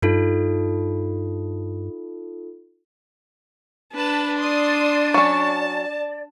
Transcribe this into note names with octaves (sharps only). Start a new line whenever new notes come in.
G2 D#4 F4 A4
D4 B4 A5 B5
D5 C6 D#6
F#3 C#4 A5